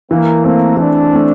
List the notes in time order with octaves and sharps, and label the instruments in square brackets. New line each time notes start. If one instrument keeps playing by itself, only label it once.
[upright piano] E3 [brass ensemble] A#3
[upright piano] A3 C4 [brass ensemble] A#3
[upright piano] E3 [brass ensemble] D4
[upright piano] A3 C4